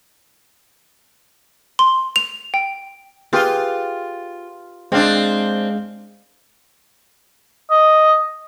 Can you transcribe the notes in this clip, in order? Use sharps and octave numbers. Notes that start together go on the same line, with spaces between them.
C6
F7
G5
F4 G4 G#4 B4
G#3 C4 D4 F5
D#5